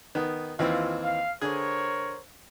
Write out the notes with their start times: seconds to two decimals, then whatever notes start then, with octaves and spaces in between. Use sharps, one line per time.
0.15 D#3 B3
0.59 D#2 E3 C4 F4
1.03 F5
1.41 D3 G#4 A#4 C5 C#5